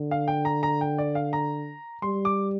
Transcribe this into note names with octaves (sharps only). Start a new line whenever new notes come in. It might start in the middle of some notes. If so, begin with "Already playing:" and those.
Already playing: D3
F5
G5
A#5
A#5
G5
D5
F5
A#5
G3 C6
D6